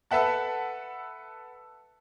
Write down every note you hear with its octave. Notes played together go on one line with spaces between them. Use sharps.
A4 B4 E5 F#5 A5